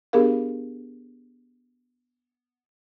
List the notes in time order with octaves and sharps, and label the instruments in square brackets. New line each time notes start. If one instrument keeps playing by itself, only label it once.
[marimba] B3 D4 G4 G#4 A#4 F5